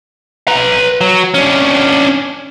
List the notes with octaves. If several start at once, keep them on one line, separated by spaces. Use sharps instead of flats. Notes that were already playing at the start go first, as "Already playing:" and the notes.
B4 A#5
F#3
C#4 D4